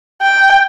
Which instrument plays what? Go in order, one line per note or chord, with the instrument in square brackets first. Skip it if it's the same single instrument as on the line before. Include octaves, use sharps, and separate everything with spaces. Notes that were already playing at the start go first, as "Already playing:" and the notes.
[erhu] G5